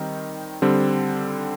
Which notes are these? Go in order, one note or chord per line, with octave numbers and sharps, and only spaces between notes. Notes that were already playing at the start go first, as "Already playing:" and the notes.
Already playing: D#3 G3 C4 D#4
D3 G3 C4